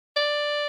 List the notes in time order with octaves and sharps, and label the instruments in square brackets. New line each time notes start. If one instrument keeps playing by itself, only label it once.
[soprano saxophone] D5